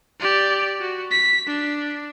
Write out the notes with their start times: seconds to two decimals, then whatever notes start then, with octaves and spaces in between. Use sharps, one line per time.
0.20 G4 D5
0.81 F#4
1.11 B6
1.47 D4